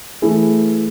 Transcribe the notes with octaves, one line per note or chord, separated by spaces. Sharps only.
E3 A3 E4 G#4